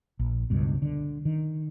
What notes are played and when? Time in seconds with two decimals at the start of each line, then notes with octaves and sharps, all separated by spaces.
0.19 A#1
0.50 C#2 G2 B2
0.82 D3
1.25 D#3